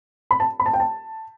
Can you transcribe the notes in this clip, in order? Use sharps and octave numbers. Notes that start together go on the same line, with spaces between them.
B5
A5
B5
A5
G5
A5